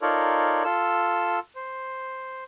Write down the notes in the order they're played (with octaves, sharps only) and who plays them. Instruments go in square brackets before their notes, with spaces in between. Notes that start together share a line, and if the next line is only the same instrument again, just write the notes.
[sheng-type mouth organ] D#4 F4 A4 A#4 C#5 D5
F4 A4 E6
C5